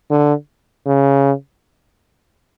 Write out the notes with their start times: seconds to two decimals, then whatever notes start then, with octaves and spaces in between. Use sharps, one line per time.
0.11 D3
0.86 C#3